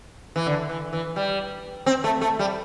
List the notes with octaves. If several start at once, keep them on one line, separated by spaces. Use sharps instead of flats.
E3
D3
E3
E3
G3
C4
A3
A3
G3